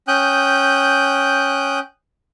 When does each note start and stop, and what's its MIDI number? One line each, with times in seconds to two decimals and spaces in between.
0.08 1.79 61
0.08 1.79 79
0.08 1.79 87
0.08 1.79 90
0.08 1.79 91